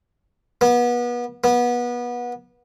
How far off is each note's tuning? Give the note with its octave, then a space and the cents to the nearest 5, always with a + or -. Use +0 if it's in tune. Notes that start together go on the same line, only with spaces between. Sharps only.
B3 -30
B3 -25